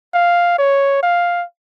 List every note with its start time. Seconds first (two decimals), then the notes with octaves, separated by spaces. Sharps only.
0.14 F5
0.59 C#5
1.03 F5